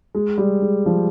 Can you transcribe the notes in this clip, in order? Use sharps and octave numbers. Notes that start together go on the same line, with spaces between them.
G#3
G3
G#3
F3